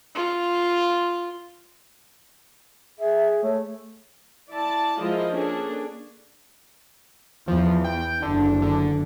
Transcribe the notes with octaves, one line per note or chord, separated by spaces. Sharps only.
F4
G#4 E5
A3 C#5
E4 D5 A5
F3 G#3 E4 F4 A#4 D#5
A#3 C#4 D4 G#4 A4
E2 F3
G5
F#1 D3 D4
D3